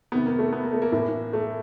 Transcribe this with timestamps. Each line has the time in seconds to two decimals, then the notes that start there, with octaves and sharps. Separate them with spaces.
0.12 C3 D#3 B3
0.26 A#3
0.39 A3
0.53 B3
0.63 A#3
0.73 A3
0.82 A#3
0.92 A2 E3
1.33 A3